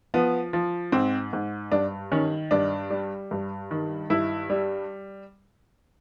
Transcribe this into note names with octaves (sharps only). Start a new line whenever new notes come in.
F3 B3
F3
G#2 C4
G#2
G2 D4
D#3 C#4
G2 D4
G3
G2
D#3
G2 E4
G3